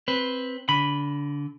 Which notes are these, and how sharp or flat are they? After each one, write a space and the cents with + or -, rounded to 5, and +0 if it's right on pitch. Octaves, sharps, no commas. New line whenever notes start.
C4 +5 B4 +0
D3 -25 B5 +0